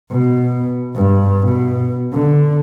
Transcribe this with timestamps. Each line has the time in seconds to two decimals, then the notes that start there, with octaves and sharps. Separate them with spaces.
0.11 B2
0.95 G2
1.46 B2
2.14 D3